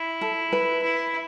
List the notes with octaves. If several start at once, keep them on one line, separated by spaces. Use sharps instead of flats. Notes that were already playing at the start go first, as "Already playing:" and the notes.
Already playing: E4
A4
B4
E4